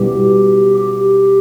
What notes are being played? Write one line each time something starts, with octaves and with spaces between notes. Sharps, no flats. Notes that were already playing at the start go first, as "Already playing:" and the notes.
Already playing: B2 G3 C#4 E4 G4
G4